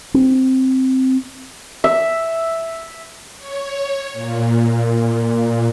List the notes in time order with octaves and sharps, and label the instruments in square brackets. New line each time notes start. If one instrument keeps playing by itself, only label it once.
[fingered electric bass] C4
[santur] E5
[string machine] C#5
A#2